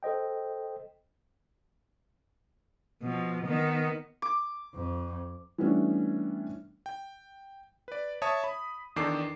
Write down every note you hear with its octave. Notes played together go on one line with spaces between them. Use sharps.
A4 C5 D#5 G5
B2 F3
D#3 B3
D6
F2
E3 G3 A3 B3 C#4 D4
G5
B4 D5
C#5 E5 A5 D#6
B5
E2 D#3 D4 A4 D6 C7